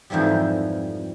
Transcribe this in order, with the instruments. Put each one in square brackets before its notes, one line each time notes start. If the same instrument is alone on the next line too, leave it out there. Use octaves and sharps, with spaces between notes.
[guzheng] F2 G#2 E3 F3 G3